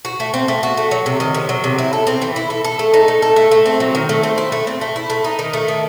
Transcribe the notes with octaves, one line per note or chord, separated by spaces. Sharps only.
F#4
A3
C4
A3
F#4
A3
F#3
C3
D#3
C3
F#3
C3
E4
A4
C4
E3
E4
A4
A4
A3
D#4
A3
A4
A3
A3
C4
F#3
D#3
A3
C4
E4
A3
C4
A3
E4
A3
D#4
D#3
A3
D#3